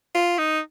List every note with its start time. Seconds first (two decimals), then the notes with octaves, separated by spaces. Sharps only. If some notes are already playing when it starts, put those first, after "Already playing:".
0.15 F4
0.38 D#4